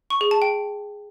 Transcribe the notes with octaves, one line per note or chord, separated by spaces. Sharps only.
C#6
G#4
A5
G5